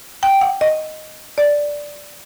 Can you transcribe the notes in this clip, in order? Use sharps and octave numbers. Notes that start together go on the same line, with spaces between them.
G5
F#5
D#5
D5